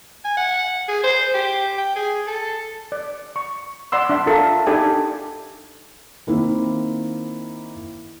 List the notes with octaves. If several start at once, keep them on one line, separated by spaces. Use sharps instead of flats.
G#5
F#5
G#4
C5
G4
G5
G#4
A4
D5
C#6
D5 F#5 C6 E6
D4 E5
F4 A4 A#4 E5
D4 D#4 G4 A4 D5 G#5
D#3 A#3 C4 E4